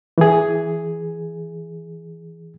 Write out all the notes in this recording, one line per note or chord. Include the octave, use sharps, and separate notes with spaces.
E3 G#4